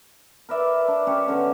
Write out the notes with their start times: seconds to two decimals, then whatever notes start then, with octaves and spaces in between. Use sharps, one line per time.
0.49 A#4 B4 D5 E5
0.88 D4
1.07 C#4 G4 C#5
1.27 B2 D3 C#4